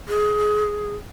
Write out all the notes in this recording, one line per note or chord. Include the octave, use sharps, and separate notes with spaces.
G#4